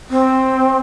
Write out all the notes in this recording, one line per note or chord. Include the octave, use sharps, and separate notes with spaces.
C4